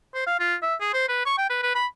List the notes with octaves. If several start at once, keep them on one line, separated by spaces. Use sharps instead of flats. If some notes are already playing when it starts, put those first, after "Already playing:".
C5
F5
F4
E5
G#4
C5
B4
C#6
G5
B4
B4
B5